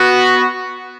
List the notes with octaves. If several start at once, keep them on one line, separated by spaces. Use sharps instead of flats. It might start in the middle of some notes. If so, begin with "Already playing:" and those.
Already playing: B3 F#4